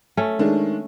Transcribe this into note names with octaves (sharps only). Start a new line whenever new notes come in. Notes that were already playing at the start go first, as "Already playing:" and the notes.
A3 C#4
D#3 G#3 D4